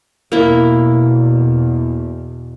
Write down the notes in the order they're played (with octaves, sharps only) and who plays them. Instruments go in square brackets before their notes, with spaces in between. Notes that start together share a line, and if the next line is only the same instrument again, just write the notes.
[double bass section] E2 B2 [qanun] A#3 E4